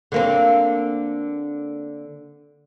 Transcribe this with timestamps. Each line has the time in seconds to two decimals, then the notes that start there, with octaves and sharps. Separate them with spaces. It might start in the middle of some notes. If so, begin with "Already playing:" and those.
0.12 D3 A#3 C4